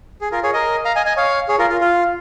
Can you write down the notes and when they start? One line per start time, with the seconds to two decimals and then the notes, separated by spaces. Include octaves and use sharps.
0.21 G#4
0.32 F4 A#4
0.43 G#4 C#5
0.54 A#4 D#5
0.85 F5 A#5
0.96 D#5 G#5
1.06 D#5 G#5
1.17 C#5 F5
1.48 G#4 C#5
1.59 F4 A#4
1.69 F4
1.81 F4